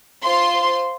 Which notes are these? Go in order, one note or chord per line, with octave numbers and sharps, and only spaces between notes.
F4 C5 C6